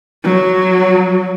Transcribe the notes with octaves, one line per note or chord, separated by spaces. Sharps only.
F#3